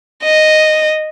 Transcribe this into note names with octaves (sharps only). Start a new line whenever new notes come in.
D#5